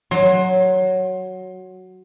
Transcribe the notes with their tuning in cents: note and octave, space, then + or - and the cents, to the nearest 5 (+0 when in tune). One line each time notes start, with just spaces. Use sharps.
F#3 +0 C6 +25